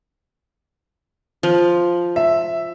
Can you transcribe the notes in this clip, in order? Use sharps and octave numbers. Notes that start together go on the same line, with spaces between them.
F3
E5